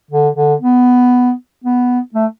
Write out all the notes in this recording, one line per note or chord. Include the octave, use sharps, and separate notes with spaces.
D3
D3
B3
B3
A3